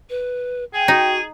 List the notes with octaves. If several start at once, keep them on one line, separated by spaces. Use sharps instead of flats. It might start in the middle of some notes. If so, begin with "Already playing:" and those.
B4
G#4 G5 G#5
D#4 F#4